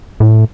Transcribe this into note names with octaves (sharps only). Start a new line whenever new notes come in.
A2